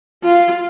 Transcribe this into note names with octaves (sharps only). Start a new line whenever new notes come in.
F4